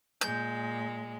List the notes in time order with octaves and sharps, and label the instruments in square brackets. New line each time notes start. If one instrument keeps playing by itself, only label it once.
[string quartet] A#2 G#3 [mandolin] G6